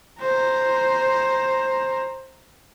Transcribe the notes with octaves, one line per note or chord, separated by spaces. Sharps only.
C5 A#5